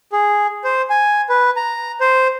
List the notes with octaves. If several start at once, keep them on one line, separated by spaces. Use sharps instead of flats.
G#4
C5
G#5
B4
A#5
C5